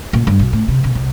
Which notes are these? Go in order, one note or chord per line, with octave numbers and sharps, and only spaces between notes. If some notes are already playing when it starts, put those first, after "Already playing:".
A#2
G2
B1
A2
C3
B2
C2